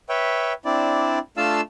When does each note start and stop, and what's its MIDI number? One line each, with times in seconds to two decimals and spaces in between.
0.09 0.53 71
0.09 0.53 73
0.09 0.53 76
0.09 0.53 79
0.65 1.19 60
0.65 1.19 62
0.65 1.19 64
0.65 1.19 74
1.37 1.61 57
1.37 1.61 62
1.37 1.61 65
1.37 1.61 77
1.37 1.61 81
1.37 1.61 88